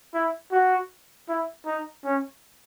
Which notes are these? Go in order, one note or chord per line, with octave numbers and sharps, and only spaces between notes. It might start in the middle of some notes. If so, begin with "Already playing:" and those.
E4
F#4
E4
D#4
C#4